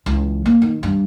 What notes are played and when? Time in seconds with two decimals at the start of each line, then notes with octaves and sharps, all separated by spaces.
0.06 C#2 E3
0.46 A#3
0.62 D#3
0.83 G2 G3